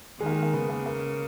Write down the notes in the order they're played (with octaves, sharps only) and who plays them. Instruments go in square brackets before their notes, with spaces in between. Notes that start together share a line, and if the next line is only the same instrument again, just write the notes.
[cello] D#3 [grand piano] G#3
[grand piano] A#3
G#3
A#3
[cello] C#3 [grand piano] B3
[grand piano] A#3
A#3